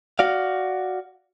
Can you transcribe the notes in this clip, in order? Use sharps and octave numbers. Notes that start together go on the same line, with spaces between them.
F#4 D5 F5